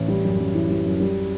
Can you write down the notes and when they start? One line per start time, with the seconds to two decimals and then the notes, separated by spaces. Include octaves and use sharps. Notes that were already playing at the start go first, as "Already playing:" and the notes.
Already playing: A1
0.08 G3
0.24 F#2
0.40 F#2
0.54 E3
0.69 G3
0.85 F#2
1.00 G3